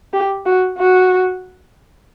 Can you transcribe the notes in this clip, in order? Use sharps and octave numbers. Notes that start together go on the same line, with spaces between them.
G4
F#4
F#4